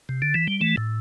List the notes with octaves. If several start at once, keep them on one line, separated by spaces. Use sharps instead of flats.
C3
D3
E3
G3
E3 A3
A2